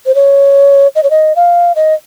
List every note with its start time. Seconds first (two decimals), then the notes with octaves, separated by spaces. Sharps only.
0.06 C5
0.15 C#5
0.95 D#5
1.03 C#5
1.10 D#5
1.36 F5
1.76 D#5